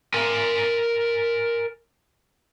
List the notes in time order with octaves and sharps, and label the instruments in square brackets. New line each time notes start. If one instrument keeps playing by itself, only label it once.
[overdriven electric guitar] A#4 G#5